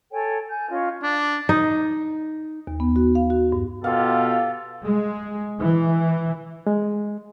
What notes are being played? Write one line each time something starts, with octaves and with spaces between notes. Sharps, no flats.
A4 C#5 G5 G#5
G#5 G6
C#4 F4 C#5 D#5
D4
D#4
D#2
B3
F#4
F5
F#4
G2
B2 F4 G4 A4 F5
G#3
E3
G#3